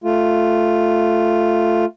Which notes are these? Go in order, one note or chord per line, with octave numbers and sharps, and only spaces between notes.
A3 F4